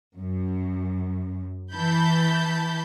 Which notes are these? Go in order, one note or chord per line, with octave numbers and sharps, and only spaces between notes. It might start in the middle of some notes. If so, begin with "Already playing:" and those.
F#2
E3 A5 B5 G6